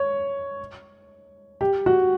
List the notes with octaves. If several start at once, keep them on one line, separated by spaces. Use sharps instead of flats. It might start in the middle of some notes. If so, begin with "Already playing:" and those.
Already playing: C#5
G4
F#4